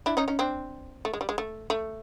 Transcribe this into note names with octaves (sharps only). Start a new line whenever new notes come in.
D4 E4
C#4 D#4
C#4 D#4
C4 D4
A3
G#3
G3
G#3
A3
A3